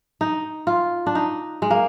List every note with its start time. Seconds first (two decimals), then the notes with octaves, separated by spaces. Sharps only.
0.21 D#4
0.67 F4
1.06 D4
1.15 D#4
1.62 G#3
1.71 A#3